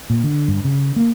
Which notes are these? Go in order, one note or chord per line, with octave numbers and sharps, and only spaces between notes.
A#2
D3
G2
C#3
A#3